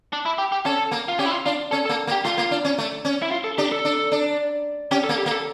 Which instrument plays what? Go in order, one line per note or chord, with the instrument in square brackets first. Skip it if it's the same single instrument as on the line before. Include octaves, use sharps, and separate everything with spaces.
[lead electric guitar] D4
E4
G4
G4
[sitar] C#4 [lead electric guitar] A4
[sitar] A#3
[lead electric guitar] F4
[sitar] C#4 [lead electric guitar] G4
[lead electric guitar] E4
F4
[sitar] D4 [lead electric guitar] F4
[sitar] C#4 [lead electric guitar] A4
[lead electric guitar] A4
[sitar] A#3
A#3
[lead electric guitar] G4
[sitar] A3 [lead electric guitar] F4
[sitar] A#3
D4
C#4
A3
C#4
[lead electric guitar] E4
F4
A4
[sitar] D4 [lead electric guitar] G4
[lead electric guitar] A4
[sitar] D4
D4
[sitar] C#4 [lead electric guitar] G4
[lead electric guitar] A4
[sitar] A#3
[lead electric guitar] G4
[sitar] A#3
[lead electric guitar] A4